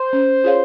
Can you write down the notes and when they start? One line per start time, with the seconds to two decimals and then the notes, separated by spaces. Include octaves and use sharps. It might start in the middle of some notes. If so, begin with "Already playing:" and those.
Already playing: C5
0.13 C#4
0.44 F4 G#4 C#5 F5